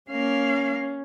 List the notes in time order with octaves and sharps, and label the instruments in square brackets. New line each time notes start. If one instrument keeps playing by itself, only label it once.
[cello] A#3 F5 [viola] C#4